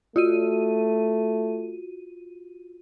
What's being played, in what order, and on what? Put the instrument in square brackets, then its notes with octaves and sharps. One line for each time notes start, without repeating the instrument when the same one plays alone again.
[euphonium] A3 [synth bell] F4 F#4 D#7